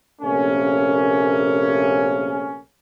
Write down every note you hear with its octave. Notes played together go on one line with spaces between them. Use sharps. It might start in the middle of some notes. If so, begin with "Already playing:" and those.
A#1 C3 A3 A#3 C#4